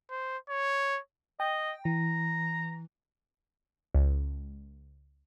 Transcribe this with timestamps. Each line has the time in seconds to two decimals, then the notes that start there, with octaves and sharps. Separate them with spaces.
0.11 C5
0.49 C#5
1.40 D#5 G5
1.85 E3 A#5
3.95 C#2